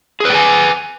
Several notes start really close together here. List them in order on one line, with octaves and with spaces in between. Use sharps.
G#4 B4 G5 G#5